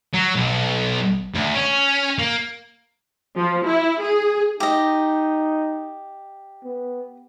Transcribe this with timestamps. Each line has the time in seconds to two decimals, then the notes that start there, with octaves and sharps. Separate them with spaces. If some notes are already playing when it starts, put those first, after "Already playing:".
0.13 F#3
0.36 B1
1.35 D2
1.55 C#4
2.19 A#3
3.36 F3
3.66 E4
4.02 G#4
4.60 D#4 G4 D#5
6.64 B3